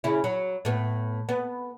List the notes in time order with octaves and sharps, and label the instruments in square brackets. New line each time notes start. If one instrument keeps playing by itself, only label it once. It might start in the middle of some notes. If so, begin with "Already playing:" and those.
[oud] C#3 E4
F#3
A2 B3
B3